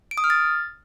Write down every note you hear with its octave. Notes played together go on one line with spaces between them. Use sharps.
D7
D#6
F6
A6